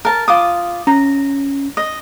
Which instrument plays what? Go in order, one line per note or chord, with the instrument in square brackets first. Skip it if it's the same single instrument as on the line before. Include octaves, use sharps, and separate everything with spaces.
[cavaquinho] A#4 A5
F4 D6 D#6
[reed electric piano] C#4 [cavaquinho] A#5
[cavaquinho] D#5